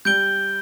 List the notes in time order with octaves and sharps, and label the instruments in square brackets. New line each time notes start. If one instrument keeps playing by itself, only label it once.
[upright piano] G3 [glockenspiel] G6 D7 G7